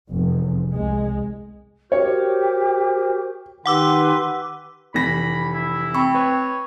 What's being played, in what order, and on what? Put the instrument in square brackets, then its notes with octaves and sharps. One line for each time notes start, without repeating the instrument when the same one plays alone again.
[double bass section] F1 E2
C2 G#3
[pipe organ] F#4 A#4 C5 [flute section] G4 D6 [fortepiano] C#5
[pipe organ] D#3 D#4 [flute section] G4 B4 C6 [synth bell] F#5 D6 E6
[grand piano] F1 E3 A#6 [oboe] B5
[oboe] E4
[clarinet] C4 [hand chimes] B5 C#6
[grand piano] B4 [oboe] C#5